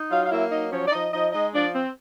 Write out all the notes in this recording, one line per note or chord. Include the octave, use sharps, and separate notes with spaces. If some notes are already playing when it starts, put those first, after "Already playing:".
Already playing: D#4
F#3 F4 F5
F5
A#3 E4 E5
F#3 D#4 D#5
F3 C#4 C#5
D5
F3 D#4 D#5
F3 D#4 D#5
G#3 D#4 D#5
F3 D4 D5
C4